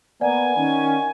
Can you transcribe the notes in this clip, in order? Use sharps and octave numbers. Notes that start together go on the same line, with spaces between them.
A#3 B3 D5 F#5 G#5 A#5
D#3 C#4